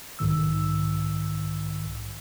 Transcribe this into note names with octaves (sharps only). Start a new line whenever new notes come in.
B1 G#2 D#3 E6